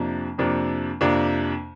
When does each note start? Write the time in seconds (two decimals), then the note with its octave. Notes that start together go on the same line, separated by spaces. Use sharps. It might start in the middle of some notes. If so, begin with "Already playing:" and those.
Already playing: F2 C3 F3 A#3 D4
0.38 F2 C3 F3 A#3 D4
1.01 F2 C3 F3 A#3 D4